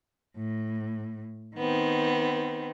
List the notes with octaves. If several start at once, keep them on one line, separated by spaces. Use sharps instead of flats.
A2
D#3 B3 C4